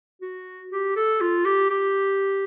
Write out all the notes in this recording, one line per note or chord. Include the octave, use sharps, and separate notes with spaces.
F#4
G4
A4
F4
G4
G4